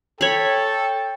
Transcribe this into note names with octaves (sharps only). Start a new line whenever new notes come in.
A4 C#5 G5 B5